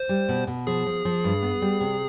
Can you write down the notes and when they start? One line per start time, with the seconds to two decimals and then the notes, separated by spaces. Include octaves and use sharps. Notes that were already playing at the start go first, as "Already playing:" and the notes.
Already playing: C5
0.09 G3
0.29 B2
0.47 B2
0.67 F3 G#4
0.86 F3
1.05 F3
1.24 G2
1.43 B3
1.62 G3
1.80 C3